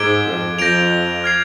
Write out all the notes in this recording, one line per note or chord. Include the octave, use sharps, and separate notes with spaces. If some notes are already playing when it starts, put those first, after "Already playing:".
Already playing: G#2 D6 G#6 D7 G7
F2
F2 G6 A#6 D7 F7
F6 G#6 C7 F7